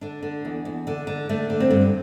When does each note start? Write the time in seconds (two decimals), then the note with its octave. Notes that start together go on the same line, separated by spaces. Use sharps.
0.01 D3 D4
0.23 D3
0.45 E2
0.65 E2
0.87 D3
1.07 D3
1.29 D3 A3
1.50 D3
1.60 C4
1.71 G2